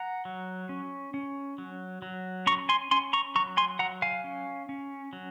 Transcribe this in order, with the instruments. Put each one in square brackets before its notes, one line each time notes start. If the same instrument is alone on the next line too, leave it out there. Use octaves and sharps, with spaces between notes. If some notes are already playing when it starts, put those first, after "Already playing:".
Already playing: [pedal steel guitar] F#5 A#5
F#3
C#4
C#4
F#3
F#3
C#4 A#5 C#6
G#5 C6
C#4 G#5 C6
A#5 C#6
F#3 A#5 C#6
G#5 C6
F#3 F#5 A#5
F5 G#5
C#4
C#4
F#3